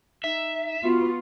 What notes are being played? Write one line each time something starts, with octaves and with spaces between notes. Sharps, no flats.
D#4 E5
B3 F4 F#4